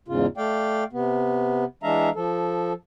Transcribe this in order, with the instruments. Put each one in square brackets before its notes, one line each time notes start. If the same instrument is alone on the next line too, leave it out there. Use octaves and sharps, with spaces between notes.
[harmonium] E2 G#2 C#3 F4
A3 D5 F5 G5
C3 B3
E3 G#3 D4 E5 F5 A#5
F3 A4